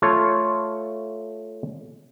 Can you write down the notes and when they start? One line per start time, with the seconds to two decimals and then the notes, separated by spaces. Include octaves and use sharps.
0.02 A3 F4 C#5